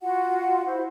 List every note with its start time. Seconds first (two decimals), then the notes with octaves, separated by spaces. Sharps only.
0.01 F4 F#4 F#5
0.66 E4 C5